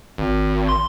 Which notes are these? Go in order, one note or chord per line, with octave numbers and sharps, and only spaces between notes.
G#1
C6